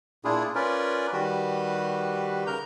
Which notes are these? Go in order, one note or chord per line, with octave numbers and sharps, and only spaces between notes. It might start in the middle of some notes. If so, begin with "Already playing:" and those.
A#2 D4 E4 F4 G#4
C#4 F4 A#4 B4 D5
D#3 G3 F#4 G4 B4
C#3 A#4 A#5 G6